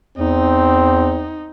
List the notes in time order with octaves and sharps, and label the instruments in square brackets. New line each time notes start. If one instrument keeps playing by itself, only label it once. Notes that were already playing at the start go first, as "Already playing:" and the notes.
[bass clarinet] E2 [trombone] C4 [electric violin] D#4